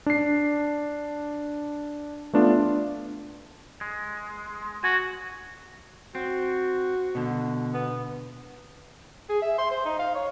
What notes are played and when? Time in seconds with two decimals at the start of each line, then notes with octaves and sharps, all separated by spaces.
0.06 D4 C7
2.33 A3 B3 D4 F4
3.81 G#3
4.84 F#4 G#5
6.15 C4 F#4
7.15 B2 D3
7.74 B3
9.29 G#4
9.42 E5
9.58 C6
9.71 C5
9.85 D#4
9.99 F5
10.15 C#5